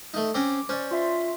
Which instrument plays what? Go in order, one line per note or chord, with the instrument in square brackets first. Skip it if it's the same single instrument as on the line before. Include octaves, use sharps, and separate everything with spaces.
[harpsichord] A3 D#4
[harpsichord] C4 C#4 [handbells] D6
[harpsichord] C#4 [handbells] C5 D5
[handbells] F4 E5 C6